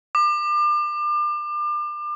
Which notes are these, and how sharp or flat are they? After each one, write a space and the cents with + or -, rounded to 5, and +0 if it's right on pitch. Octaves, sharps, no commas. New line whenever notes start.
D6 +35